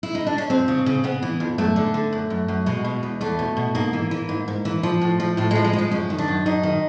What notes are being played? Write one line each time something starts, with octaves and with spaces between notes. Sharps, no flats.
E4
D#4
D4
C#4
F2 C4
C#3
C#3
C#3 B3
E3
F2
F#2 A3
D3
D3
F#2
F#2
F#2
B2 G#3
B2
E2
E2 A3
B2
B2
G#2 A#3
E3
E3
G#2
G#2
E3
F3
A2
F3
A2 A3
G#3
F3
G#3
F3
G#3
F#2 C#4
D#3
D4
F#2
F#2 D#4
D#3